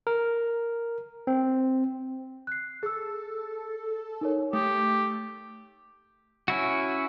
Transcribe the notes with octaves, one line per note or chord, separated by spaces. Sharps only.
A#4
C4
F#6 C7
G#4 A4 E6
D#4 A#4 C#5
A3 G4 D#6
C#4 E4 F#4